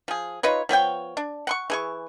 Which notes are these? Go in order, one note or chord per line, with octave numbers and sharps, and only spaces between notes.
F3 G#4
D#4 F4 B4 C#5
F3 B3 C#5 G5
D4
F#5 C6 C#6
E3 G#4 C#6